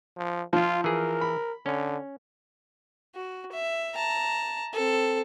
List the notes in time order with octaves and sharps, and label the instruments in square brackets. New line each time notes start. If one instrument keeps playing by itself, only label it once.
[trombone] F3
[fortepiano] F3 [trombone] F4
[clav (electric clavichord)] E3 G#4 [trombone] A#4
[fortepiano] B5
[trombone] D3 [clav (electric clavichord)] C#4
[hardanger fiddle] F#4
E5
A5 A#5
C4 A4